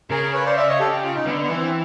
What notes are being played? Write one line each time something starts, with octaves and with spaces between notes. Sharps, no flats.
C#3 G#4 A#4
B4 C#5
C5 D5
D5 E5
C#5 D#5
G4 A4
G4
F4
D#4
D3 B3
B3
E3
C4